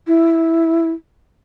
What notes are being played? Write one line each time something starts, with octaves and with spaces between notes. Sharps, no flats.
E4